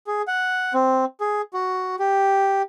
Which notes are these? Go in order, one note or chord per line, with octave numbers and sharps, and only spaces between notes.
G#4
F#5
C4
G#4
F#4
G4